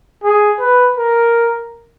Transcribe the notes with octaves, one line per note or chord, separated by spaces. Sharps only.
G#4
B4
A#4